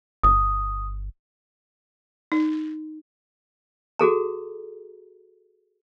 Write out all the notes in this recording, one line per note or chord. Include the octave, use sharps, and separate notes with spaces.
G1 D#6
D#4
F#4 G#4 A4 A#5